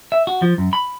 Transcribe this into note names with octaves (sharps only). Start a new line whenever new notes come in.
E5
F#4
F3
F#2
B5